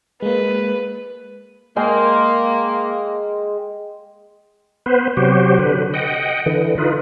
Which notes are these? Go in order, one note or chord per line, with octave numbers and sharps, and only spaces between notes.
G#3 A#3 B4
G#3 A#3 G5 C6
B3 B4 C5
C3 F#3 F#4 G4 C5
D3 B4
D#5 F#5 G5
D3 E3
D#4 F4 B4